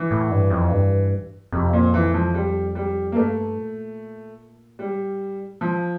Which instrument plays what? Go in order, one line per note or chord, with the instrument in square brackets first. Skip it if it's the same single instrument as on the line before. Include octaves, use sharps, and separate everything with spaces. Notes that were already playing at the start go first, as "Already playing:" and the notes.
Already playing: [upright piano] E3
[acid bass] A2
G2
F2
G2
[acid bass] F2 [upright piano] C3
[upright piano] A#2
E3
F3
G3
G3
A#3
[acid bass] G2 [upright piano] A3
[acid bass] A#2
[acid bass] A2 [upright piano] G3
[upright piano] F3